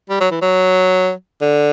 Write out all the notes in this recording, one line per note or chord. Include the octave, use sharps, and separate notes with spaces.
G3
F#3
E3
F#3
D3